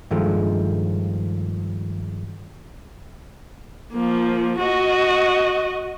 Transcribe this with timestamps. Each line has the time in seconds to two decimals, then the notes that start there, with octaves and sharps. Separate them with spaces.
0.11 G2 D#3 F3 G#3 A3
3.93 F3 A#3
4.59 F#4 D#5